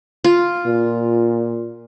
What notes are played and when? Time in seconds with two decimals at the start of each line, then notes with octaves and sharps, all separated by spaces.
0.24 F4
0.67 A#2